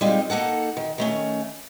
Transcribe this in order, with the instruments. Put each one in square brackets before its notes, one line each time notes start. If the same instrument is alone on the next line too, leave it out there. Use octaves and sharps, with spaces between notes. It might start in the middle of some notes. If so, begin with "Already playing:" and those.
[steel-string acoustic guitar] G3 G#3 C4 D#4 F4
A#3 D#4 A4 F#5
D#3
D#3 A3 C#4